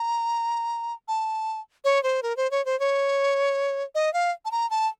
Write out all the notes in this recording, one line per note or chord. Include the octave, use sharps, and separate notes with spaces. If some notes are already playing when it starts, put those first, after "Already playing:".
Already playing: A#5
A5
C#5
C5
A#4
C5
C#5
C5
C#5
D#5
F5
A5
A#5
A5